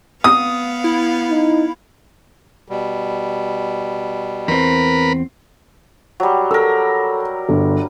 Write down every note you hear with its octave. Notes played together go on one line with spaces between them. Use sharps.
B3 F5 D#6
E4
D#4
B2 G3
E2 C4 A#4 B4 B5
F#3 G3
A4 A#4 E6
G1